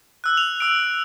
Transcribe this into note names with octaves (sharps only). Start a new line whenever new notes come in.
E6 F#6
F7
E6 D7